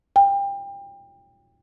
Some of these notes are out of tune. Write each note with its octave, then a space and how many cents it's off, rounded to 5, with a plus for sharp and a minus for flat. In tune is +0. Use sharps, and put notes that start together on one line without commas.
G5 +25